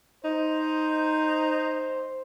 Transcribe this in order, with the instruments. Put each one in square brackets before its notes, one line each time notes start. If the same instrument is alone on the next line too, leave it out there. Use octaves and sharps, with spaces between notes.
[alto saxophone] D#4 [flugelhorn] C5